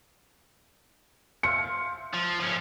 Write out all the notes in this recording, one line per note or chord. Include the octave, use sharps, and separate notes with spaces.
C5 E5 F5 C#7
F3
F3 C#4